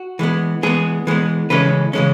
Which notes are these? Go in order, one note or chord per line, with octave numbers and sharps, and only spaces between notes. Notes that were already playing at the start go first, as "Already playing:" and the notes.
Already playing: F#4
E3 G#3 B3
E3 G#3 B3 G#4
E3 G#3 B3
C#3 E3 G#3 C#4 B4
C#3 E3 G#3 C#4